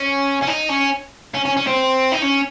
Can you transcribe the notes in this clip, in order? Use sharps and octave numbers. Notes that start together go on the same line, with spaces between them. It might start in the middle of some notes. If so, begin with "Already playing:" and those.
Already playing: C#4
C#4
D#4
C#4
C#4
C#4
C#4
C4
D#4
C#4